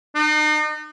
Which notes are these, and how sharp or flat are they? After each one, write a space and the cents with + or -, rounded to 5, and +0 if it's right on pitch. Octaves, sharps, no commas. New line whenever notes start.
D#4 -40